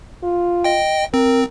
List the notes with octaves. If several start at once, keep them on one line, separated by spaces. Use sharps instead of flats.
F4
D#5 G5
C4 A#4